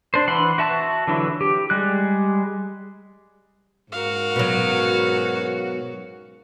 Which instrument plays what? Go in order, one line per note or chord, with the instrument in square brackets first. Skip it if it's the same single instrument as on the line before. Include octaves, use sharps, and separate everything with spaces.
[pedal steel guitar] D4 C5
E3 F#5 B5 C6
F#4 E5 A5
D3 E3 F#3 E4
G4
G3 G#3 F#6
[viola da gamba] G#2 C#4 F#4 [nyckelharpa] A#4 F5
[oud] B2 F#3